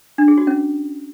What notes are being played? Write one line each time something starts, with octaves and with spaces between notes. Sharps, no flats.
D4
G#4
F#4
C#4